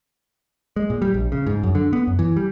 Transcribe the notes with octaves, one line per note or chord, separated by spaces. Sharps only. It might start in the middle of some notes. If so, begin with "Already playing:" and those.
G#3
A#2
G3
A#1
C#3
G#2
F#2
D3
B3
F#2
E3
G3